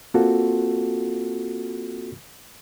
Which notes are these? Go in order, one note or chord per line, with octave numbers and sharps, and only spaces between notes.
A#3 C4 F4 F#4 A4